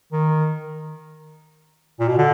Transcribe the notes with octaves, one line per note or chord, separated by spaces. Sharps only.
D#3
A#2
B2
D3